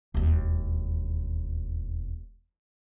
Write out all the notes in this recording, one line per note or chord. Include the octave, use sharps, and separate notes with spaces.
E1 D#2